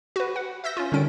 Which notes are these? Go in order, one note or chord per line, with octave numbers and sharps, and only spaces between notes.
F#4 B4
F#5
E5 E6 G6 A#6
C#4 F4
D3 D#3 G3 C#4 D7